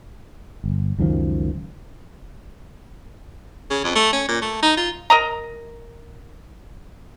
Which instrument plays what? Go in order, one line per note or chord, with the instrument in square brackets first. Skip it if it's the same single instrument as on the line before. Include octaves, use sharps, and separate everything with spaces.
[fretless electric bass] G1
C#2 F#2 D#3 F3
[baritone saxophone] C#3
F2
A3
C#4
A#2
A3
D#4
F4
[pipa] A#4 D#5 A#5